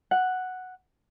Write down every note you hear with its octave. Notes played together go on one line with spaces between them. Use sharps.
F#5